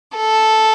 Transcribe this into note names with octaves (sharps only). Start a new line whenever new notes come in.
A4